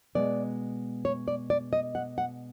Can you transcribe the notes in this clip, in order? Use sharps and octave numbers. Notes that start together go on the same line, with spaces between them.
B2 G#3 B3 D5
C#5
D5
D5
D#5
F#5
F#5